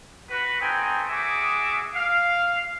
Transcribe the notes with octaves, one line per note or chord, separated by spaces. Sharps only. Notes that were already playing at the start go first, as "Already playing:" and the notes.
F#4 B4
A3 C4 D#4 G5 G#5
F#4 G#4 E5 D6 D#6
F5